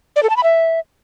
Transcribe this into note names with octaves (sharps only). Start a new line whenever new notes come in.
D5
A4
A5
B5
E5